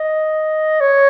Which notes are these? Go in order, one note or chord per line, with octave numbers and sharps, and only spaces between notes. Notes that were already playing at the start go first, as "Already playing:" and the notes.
Already playing: D#5
C#5